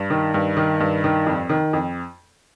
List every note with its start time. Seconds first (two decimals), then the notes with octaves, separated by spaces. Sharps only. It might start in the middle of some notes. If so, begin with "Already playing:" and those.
Already playing: G2
0.10 D#3
0.34 G2
0.57 D#3
0.80 G2
1.04 D#3
1.27 F2
1.50 D#3
1.73 F2